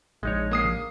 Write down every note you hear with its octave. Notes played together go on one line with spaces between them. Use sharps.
A#1 G#3 D#4 C#5
A#3 D#6 C7